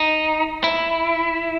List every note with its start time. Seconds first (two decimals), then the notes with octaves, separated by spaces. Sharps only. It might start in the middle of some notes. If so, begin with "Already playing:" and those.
Already playing: D#4
0.64 E4